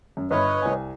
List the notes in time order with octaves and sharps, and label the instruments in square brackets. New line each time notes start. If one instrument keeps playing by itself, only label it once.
[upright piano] F#2
[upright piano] G1 B5 [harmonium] B4 C#5 D#5
[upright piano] C2 G#5